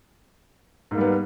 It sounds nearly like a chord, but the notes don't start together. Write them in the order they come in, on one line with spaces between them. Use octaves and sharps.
G#2 A#3 G3 B3